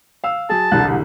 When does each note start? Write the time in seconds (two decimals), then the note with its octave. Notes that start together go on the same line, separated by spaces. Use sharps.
0.24 F5 E6
0.50 F#3 G#4 A5
0.71 E1 C2 D3 F#6